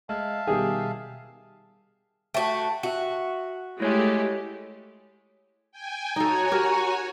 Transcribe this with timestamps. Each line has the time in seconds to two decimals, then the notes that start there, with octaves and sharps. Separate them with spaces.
0.09 G#3 E5 F5 A5
0.47 B2 D#3 G3 G4 G#4
2.34 A3 F#4 G5 B6
2.83 F#4 E5 F#5
3.80 G#3 A3 E4 G4 C#5 G#5
5.72 G5 G#5
6.16 D#4 F#4 A4 C#5 G#5 A#5
6.51 G4 A#4